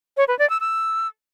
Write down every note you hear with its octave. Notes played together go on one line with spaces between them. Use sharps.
C#5
B4
D5
E6
E6